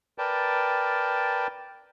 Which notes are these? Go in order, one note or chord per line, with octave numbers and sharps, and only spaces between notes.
A#4 B4 D5 G5 A5